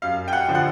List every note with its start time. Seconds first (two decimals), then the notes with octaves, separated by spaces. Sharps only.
0.02 F#2 F5
0.28 G5
0.33 F#5
0.48 D3 F3
0.55 F#5